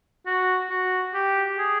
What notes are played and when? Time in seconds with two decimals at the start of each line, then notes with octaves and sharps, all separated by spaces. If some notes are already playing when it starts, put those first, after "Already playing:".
0.26 F#4
0.70 F#4
1.14 G4
1.58 G#4